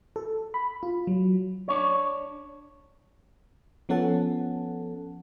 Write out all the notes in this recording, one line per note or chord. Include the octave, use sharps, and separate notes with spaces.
A4
B5
F4
F#3
D4 C#5
F3 B3 C#4 A4 F#5 A5